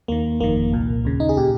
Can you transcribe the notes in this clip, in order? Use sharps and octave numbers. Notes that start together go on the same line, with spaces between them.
D#2 D#3 A#3
G1 F2 D#3 A#3
C2 A#2
D#2 C#3
D#4
G#4
A#2 G4